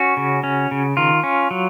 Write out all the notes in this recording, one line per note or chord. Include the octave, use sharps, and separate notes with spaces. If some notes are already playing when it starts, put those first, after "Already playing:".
Already playing: C#4 F#4
C#3
C#4
C#3
D#3 F4
C#4
F#3